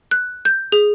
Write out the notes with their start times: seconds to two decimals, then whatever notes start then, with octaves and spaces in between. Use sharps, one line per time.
0.11 F#6
0.45 G6
0.72 G#4